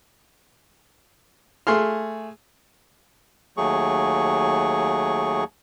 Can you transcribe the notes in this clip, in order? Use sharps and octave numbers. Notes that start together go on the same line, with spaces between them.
A3 G#4 C6 F6
D#2 F#3 A3 G#4 C#6